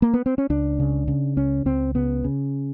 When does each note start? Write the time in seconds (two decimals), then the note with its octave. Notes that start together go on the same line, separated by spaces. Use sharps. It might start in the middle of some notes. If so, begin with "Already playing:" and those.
0.02 A#3
0.14 B3
0.26 C4
0.38 C#4
0.50 C#2 D4
0.79 C#3
1.08 C#3
1.36 C#2 C#4
1.65 C#2 C4
1.95 C#3 B3
2.24 C#3